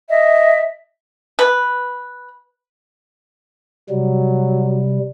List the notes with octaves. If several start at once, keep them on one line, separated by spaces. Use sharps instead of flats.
D#5 E5
B4
C3 F#3 G3